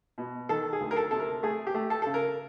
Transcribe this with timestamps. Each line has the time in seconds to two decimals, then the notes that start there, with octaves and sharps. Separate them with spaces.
0.18 B2
0.49 D#3 A4
0.73 G#4
0.80 D2
0.91 A#4
0.96 A4
1.11 C3 A4
1.20 A#4
1.43 A3 G#4
1.67 G4
1.74 A3
1.90 A4
2.02 C#3 A4
2.14 A#4